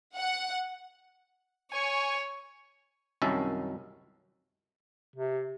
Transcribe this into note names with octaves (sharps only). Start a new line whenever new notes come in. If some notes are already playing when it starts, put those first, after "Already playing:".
F#5
C#5 G#5 C#6
C2 F#2 D#3 C#4 E5 A5
C3